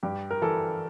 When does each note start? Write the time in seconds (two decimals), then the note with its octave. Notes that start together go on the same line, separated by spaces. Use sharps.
0.03 G2 G4
0.31 A#4
0.42 E3 A4